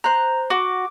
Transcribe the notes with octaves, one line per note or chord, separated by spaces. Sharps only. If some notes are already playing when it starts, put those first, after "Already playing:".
C5 A#5 F#6
F#4 D6